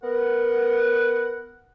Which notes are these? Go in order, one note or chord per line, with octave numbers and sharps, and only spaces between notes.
B3 A#4 F#5